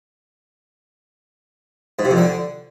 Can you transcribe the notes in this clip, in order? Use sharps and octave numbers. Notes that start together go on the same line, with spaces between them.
G#2
C3
F2
D3